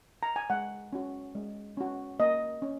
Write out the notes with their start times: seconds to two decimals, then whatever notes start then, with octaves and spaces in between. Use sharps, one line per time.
0.23 A#5
0.36 G#5
0.50 G#3 F#5
0.93 C#4 F#4
1.35 G#3
1.77 C#4 F#4
2.20 A#3 D#5
2.62 C#4